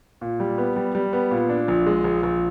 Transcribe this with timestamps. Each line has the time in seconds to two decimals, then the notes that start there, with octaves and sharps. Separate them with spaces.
0.21 A#2
0.40 G3
0.58 B3
0.76 G3
0.95 G3
1.13 B3
1.31 A#2
1.49 D4
1.68 A#1
1.86 G#3
2.04 A#1
2.23 A#1